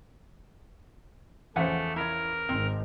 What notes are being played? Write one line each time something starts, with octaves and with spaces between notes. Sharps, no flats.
E2 C#3 F3 A3 E5 F#5 G#5
E4 A#4 C#5
G#1 C4